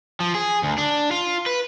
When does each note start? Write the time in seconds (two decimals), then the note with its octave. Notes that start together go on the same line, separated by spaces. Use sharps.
0.20 F3
0.35 G#4
0.63 D2
0.78 D4
1.11 F4
1.46 B4